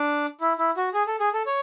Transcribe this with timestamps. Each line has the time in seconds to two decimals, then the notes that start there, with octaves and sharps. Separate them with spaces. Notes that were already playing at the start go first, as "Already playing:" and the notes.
Already playing: D4
0.41 E4
0.59 E4
0.77 F#4
0.94 G#4
1.07 A4
1.20 G#4
1.34 A4
1.46 C#5